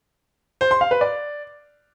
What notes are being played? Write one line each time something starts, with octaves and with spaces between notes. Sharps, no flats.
C5
C6
F5
B4
D5